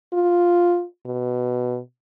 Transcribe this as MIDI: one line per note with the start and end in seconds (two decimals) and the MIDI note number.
0.13 0.85 65
1.06 1.79 47